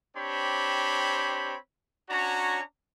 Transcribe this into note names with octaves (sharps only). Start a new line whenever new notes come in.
C4 D4 G4 C5 C#5 B5
C#4 D4 F#4 C#5 A#5